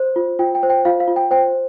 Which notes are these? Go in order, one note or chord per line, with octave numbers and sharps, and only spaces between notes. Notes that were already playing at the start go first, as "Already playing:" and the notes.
Already playing: C5
F4
F4 G5
G5
C5
G5
F4 F5
F5
F4
G5
C5 G5